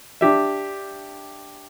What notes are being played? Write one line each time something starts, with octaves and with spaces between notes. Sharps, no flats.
D4 G4 E5